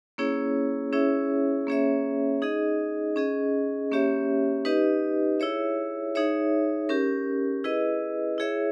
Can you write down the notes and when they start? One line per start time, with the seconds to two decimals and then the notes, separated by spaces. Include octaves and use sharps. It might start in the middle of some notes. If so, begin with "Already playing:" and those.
0.18 A#3 C#4 E4 G#4 C#5
0.93 C#4 E4 G#4 C#5 E5
1.67 A#3 C#4 G#4 C#5 E5
2.42 D#4 G#4 D#5
3.16 C#4 G#4 D#5
3.91 A#3 C#4 G4 C#5 E5
4.65 D#4 G4 B4 D#5
5.40 E4 G#4 C#5 E5
6.15 D#4 G#4 C#5 E5
6.89 C#4 G4 A#4
7.64 E4 G#4 B4 D#5
8.38 E4 G#4 C#5 E5